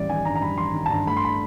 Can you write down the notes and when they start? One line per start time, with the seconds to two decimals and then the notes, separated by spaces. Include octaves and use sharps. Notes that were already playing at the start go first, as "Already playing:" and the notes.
Already playing: A1 G3 D5
0.09 D#3 G#5
0.25 G2 A#5
0.36 A#5
0.41 G3 B5
0.57 A1 C6
0.74 D#3
0.86 A5
0.90 G2 A#5
1.07 A3 B5
1.17 C6
1.25 B5